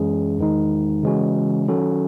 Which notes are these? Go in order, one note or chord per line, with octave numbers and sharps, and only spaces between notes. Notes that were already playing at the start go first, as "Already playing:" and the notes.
Already playing: F#2 E3 G#3 C#4 G#4
E2 D#3 G#3 D#4
C#3 E3 G#3 C#4 F#4
D#3 F#3 C#4 F#4 A4